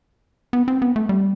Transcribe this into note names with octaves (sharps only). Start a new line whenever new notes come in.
B3
C4
B3
A3
G3